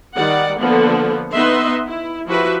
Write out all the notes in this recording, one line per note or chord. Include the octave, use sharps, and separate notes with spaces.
D#3 G3 D5 F#5
D3 F3 A#3 B3
B3 D#4 B4 D#5 E5 C6
E4
F3 E4 F#4 G4 B4 E5